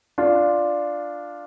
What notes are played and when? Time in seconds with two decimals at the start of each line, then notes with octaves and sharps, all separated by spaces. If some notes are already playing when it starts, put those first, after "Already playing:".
0.18 D4 F4